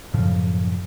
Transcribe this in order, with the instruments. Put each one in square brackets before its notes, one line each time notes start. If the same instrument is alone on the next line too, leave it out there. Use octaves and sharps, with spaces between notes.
[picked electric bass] F#2 A2 C#3 F3